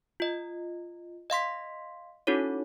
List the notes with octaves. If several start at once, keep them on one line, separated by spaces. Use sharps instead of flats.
F4 D#5
D#5 F5 C6 B6
C#4 D#4 E4 F#4 A4 C#5